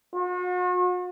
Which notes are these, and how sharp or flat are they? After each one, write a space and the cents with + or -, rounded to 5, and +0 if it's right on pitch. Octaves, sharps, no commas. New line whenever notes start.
F#4 -40